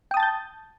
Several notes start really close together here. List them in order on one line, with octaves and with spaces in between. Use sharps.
G5 D#6 A5 A6 G6